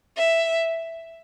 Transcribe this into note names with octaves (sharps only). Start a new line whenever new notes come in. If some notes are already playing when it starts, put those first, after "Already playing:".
E5